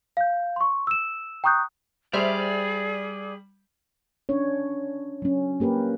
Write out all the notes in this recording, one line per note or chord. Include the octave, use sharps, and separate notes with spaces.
F5 G6
C6 C#6
E6 E7
G5 A#5 C#6 D#6 F#6 G6
G3 G#4 C5 D5 E5 F6
C#4 D4 C#5
F#3 C#4
A#3 G4 A#4 B4